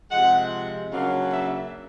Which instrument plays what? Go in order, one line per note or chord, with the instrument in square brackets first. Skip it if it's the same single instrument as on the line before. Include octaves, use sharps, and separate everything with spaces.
[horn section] C3 F3 G#3 F#5
C#3 F#3 A#3 D4 F5
E5